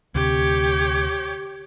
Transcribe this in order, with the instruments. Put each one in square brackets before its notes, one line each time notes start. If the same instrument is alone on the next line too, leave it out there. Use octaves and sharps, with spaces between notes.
[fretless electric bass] D2 C3 [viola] G4 C#5